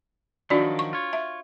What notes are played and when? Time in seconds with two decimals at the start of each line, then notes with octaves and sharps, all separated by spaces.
0.50 D#3 F3 F#3 D4 F#4 D5
0.79 C#6
0.93 F4 C#5
1.13 E5